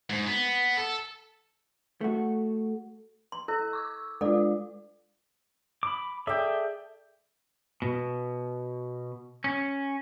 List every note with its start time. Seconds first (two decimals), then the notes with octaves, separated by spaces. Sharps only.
0.10 G#2
0.27 B3
0.78 A4
2.01 A3 F#4
3.32 C6
3.48 E4 A4 E6
3.73 C#6 D6 E6
4.21 G#3 F4 A4 D5
5.83 B5 D6
6.27 G#4 A4 D5 E5 G5
7.82 B2
9.44 C#4